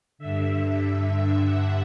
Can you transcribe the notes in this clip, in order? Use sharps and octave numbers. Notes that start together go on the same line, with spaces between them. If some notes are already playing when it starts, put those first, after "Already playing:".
G2 D3 E5
F#5